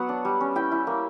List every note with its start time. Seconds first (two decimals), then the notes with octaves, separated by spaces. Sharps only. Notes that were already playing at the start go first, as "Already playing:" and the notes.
Already playing: F#3 B3 F#5
0.09 D4
0.25 G3
0.40 C#4
0.56 E4 G5
0.72 E4
0.87 A#3